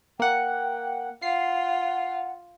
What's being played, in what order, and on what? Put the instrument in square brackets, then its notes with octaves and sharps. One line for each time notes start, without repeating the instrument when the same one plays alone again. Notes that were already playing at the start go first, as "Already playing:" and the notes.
[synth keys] A#3 F#5 [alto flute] G5
[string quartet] F4 [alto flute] F#5 [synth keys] C7